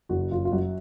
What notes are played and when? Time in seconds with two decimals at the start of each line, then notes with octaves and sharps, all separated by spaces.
0.09 F#1 F#4
0.31 F#1 F4
0.45 F4
0.52 F#2 F#4